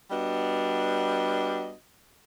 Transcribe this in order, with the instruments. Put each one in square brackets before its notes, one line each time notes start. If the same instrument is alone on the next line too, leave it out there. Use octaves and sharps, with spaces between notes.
[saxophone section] G3 B3 D4 F#4 D#5